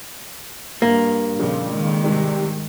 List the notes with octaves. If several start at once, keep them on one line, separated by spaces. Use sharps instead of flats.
G2 A#3
F2 A#2 C#3 F3
D#3 G#3
G#2 C3 G3